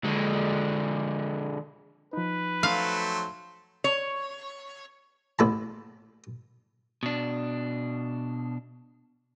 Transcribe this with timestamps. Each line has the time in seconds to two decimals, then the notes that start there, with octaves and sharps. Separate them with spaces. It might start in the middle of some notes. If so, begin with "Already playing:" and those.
0.04 D3 G#3
2.13 F3 D#4 B4
2.63 F#3 A3 C5 F5
3.84 C#5
5.39 A1 E4 A5
7.03 B2 D4